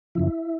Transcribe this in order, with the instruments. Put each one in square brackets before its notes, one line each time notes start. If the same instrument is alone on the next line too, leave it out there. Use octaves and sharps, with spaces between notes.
[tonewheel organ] F#2 C#3 F3 E4